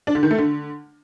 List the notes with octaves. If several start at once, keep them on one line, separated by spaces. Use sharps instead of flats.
D4
D3
D#3
A3
D3